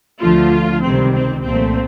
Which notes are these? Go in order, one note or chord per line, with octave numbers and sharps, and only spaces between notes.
D2 D3 F3 A3 F4
C#2 C3 D#3 G3 C4
C4
C2 A#2 F3 A3 C4